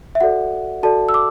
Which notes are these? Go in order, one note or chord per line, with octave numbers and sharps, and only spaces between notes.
E5
F#4 A4 D5 F#5
F#4 A4 D5 A5
E6
D6